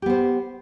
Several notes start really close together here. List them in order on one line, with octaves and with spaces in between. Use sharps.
G4 B3 C5